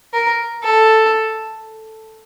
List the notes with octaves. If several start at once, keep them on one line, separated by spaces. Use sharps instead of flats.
A#4
A4